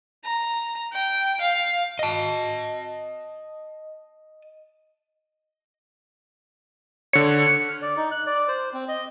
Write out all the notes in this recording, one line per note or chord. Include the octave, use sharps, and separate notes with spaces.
A#5
G5
F5
D#5 A5
D3 C#5 C#7
F6
D5
D#4
F#6
D5
C5
C4
D#5